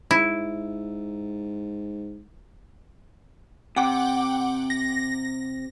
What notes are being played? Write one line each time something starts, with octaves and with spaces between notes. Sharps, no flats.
G#2 E4
C3 F#5 G5 D6
A#6